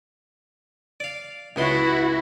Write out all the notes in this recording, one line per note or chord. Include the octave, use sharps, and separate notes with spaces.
D5 F5
C#2 B3 E4 F#4 C6